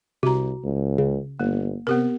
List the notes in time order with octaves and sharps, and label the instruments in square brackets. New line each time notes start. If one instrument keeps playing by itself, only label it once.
[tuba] C2 [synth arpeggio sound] C3 [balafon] F#4 A#5
[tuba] C#2
[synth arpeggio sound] C#3
[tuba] G1 [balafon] A#3
[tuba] C3 [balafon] B3 G4 A#4